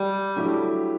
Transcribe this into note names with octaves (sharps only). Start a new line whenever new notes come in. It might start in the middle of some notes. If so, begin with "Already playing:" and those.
Already playing: G3
D3 F#3 A3 E4 G4